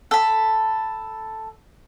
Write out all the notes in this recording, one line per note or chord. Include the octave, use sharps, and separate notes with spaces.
A4 B5